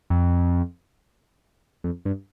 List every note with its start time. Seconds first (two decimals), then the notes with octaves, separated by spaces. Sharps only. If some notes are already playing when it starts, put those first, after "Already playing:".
0.10 F2
1.84 F2
2.05 G2